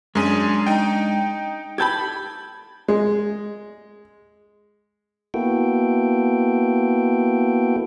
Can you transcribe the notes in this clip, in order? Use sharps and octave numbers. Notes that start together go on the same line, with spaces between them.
F#2 G#3 C#4 D4 G#4 D#7
D#4 G5
G4 A4 A5 B5 G6 G#6
G#3
A#3 B3 E4 F#4 A4 G5